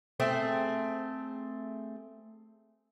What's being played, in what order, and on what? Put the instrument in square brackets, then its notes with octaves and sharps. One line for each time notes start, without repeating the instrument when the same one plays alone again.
[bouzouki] A3 C4 G#4